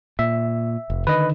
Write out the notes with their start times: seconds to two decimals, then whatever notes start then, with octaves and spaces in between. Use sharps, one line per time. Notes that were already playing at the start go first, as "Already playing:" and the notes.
0.19 A#2 E5
0.90 F1
1.07 D3 D#3 B4 D#5